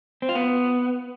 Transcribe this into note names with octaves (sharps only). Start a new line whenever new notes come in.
C4
F4
B3